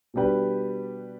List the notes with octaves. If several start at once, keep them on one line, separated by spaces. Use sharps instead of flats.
B2 G3 D4 G4 B4